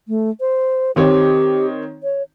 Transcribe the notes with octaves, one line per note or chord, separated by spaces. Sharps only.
A3
C5
D#3 C4 G4 C#5
C#5